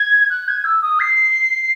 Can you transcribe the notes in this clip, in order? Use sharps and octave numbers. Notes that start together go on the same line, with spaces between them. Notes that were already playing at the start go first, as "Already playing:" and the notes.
Already playing: G#6
F#6
G#6
E6
D#6
C7